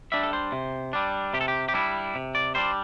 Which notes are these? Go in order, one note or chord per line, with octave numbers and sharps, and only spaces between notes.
G3 D4 E5
A4
C5
C3
G3 D4
C3 G4
A4
G4
G4
G3 D4 E4
C3
D5
G3 D4 C5